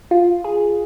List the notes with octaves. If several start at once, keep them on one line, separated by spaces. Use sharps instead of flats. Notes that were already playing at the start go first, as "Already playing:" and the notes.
F4
G#4